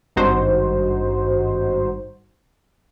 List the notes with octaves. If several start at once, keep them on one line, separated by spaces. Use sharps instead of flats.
G#1 G2 D#4 F#4 C5